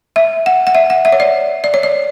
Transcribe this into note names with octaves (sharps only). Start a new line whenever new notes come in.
E5
F#5
F#5
E5
F#5
E5
C#5
D5
D5
C#5
D5